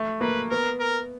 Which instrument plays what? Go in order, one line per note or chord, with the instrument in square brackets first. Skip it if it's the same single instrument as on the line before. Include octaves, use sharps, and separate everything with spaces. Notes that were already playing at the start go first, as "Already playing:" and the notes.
Already playing: [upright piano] A3
[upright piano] A#3 [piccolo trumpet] B4
[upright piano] B3 [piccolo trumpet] A#4
[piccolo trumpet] A#4